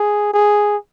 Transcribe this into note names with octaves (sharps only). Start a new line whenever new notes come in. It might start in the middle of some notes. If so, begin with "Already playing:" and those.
Already playing: G#4
G#4